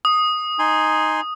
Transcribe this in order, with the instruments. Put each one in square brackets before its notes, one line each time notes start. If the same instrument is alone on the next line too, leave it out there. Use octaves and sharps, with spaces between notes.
[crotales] D#6
[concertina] D#4 G#5 C6